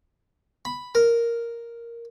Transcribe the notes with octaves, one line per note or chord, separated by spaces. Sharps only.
B5
A#4